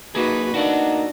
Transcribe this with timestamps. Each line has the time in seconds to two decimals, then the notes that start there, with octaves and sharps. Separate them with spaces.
0.15 A#3 D#4 F#4 G#4 B4
0.54 A#3 D4 D#4 F#4 D5 F#5